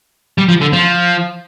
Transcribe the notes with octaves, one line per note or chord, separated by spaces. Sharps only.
G3
F3
D3
F3